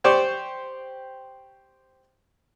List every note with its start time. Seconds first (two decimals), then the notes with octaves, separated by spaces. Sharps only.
0.04 G4 C5 D5 G5 C#6